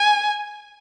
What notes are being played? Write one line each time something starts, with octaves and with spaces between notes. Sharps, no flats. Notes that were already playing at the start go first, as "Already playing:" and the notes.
Already playing: G#5